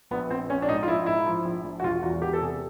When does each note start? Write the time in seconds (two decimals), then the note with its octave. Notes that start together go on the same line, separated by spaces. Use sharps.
0.11 A#1 B3
0.30 A#1 C4
0.49 A#1 C#4
0.62 D4
0.69 G#2 D#4
0.83 F4
0.87 A#1 E4
1.06 G#2 E4
1.26 F3
1.45 A#1
1.64 A#1
1.80 F#4
1.83 E1 F4
2.03 E2 F#4
2.22 E2 G4
2.33 A4
2.41 C3 G#4